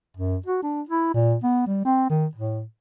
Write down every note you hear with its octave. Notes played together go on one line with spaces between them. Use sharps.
F#2
F#4
D4
E4
A#2
B3
G3
C4
D#3
A2